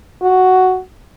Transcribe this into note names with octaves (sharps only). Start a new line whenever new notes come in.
F#4